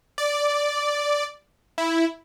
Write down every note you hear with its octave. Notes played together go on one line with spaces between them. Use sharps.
D5
E4